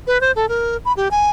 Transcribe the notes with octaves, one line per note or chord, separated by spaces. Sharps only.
B4
C5
A4
A#4
B5
G4
G#5